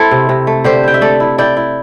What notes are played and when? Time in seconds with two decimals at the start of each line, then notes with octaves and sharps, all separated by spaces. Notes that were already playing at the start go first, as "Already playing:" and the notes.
Already playing: C4 E4 A4
0.11 C3
0.29 C3
0.47 A3
0.64 D3 G4 C5
0.84 E4 G5
0.94 E5
1.01 A3 A4 D5
1.20 E4
1.38 E4 D5 G5
1.57 E4